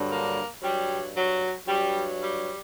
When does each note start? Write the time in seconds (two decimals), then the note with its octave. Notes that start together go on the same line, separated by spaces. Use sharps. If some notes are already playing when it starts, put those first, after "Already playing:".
Already playing: G2 D3 F#3
0.09 A#3
0.62 G2 F#3 G3
1.14 F#3
1.66 G2 F#3 G3
2.20 G3